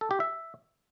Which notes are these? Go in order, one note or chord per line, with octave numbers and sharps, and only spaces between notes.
A4
G4
E5